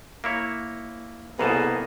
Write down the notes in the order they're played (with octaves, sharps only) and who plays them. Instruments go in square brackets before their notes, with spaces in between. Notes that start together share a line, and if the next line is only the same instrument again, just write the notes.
[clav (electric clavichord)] A#3 E4 C#5
[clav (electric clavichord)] C2 B2 A5 [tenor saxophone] A#3 [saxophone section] B3 G#4 [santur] A4 E5